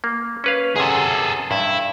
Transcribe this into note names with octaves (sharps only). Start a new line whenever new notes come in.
A#3
C#4 B4 F5
F#2 C3 G#4 A4
G2 E4